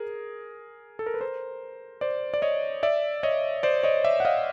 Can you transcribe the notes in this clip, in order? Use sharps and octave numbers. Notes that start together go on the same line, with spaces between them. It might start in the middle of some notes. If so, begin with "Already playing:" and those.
Already playing: G#4 A#4
A4
A#4
B4
A#4 C5
C5 D5
D5
C#5 D#5
D5 E5
C#5 D#5
C5 D5
C#5 D#5
D5 E5
F#5
D#5 F5